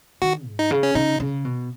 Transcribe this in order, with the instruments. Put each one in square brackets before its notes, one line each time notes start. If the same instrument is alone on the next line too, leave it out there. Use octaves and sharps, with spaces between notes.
[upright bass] D#3 [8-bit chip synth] F#4
[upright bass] G#2
[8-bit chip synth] D#4
[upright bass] C#3
[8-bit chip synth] C#4
[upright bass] C#3 [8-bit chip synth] D#4
[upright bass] C#3
B2